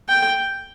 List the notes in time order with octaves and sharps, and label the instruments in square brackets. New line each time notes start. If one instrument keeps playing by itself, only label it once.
[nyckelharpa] G5